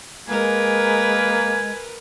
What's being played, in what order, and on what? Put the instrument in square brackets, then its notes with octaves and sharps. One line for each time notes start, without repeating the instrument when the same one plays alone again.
[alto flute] G#3 [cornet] A#3 [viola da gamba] A#4 B4 [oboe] G#5